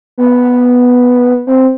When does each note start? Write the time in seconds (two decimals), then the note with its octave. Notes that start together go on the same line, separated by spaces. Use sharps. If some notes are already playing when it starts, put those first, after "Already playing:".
0.18 B3
1.47 C4